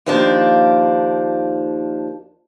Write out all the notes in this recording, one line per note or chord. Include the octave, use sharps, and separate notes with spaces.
D#2 D#3 F3 A#3 D4